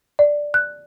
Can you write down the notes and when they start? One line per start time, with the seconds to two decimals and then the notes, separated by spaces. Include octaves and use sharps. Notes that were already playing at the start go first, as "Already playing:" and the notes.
0.19 D5
0.54 F#6